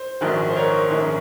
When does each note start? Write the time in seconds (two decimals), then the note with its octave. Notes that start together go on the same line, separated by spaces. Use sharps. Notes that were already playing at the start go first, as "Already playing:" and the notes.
Already playing: C5
0.21 A#1 G#2 D#3 F#3
0.50 C5
0.56 A#4 C#5
0.90 A#1 G#2 D#3 A#3 C#4